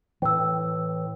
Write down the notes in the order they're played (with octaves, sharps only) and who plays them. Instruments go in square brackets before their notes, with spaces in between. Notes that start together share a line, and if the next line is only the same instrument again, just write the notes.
[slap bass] A2 E3 [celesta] G5 E6